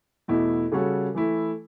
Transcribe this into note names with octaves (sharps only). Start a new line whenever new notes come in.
E2 B2 A3 E4
C#3 G3 C#4 F#4 A4
E3 A3 E4